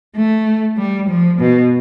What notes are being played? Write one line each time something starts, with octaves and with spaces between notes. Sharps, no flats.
A3
G3
F3
B2